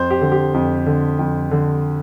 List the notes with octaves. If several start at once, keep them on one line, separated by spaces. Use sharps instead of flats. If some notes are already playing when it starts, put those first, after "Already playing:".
Already playing: F2 C5
G4
D3
G4
F2
D3
F2
D3